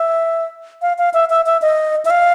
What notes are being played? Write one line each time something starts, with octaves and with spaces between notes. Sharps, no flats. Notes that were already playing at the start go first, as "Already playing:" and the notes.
Already playing: E5
F5
F5
E5
E5
E5
D#5
E5
F5